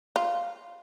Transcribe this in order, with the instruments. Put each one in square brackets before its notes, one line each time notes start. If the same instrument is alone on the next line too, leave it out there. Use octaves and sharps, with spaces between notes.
[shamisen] F4